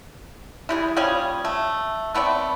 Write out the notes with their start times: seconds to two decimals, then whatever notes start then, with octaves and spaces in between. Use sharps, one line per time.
0.69 E3 G3 G#4
0.97 F3 G3 C#4 G#4
1.45 A3
2.15 A3 B3 C4 D5